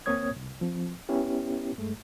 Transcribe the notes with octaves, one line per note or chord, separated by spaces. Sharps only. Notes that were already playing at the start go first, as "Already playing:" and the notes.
D2 A#3 C4 C#5 D#6 G#6
C2
F3 C4
B3 C#4 E4 G4
G2 G#3 A3